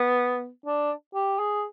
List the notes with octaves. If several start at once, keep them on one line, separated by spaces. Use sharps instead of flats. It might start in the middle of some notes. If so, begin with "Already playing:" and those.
Already playing: B3
D4
G4
G#4